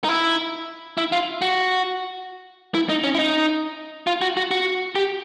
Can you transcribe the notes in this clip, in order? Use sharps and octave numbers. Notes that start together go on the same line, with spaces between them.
D#4
E4
E4
F4
F#4
E4
D#4
C#4
E4
D#4
F4
F#4
F#4
F#4
G4